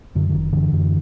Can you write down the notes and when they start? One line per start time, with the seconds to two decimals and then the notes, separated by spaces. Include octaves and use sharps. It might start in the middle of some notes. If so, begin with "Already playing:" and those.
0.15 F#2 D3
0.29 D3
0.34 F#1 D#3
0.53 F#2 D3 E3
0.72 F#2